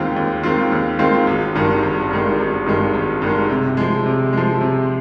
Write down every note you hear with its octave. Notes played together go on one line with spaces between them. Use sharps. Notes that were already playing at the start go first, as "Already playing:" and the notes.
Already playing: D#2 D#3 G#3 C4 F4
D#2
D#3 G#3 C4 F4
D#2
D#3 G#3 C4 F4
G#1
G2 D#3 G#3
G#1
G2 D#3 G#3
G#1
G2 D#3 G#3
G#1
G2 D#3 G#3
C3
F3 G#3
C3
F3 G#3
C3